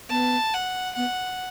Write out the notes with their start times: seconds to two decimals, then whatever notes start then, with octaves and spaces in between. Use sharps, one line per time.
0.10 B3 A5
0.53 F#5
0.96 B3 F#5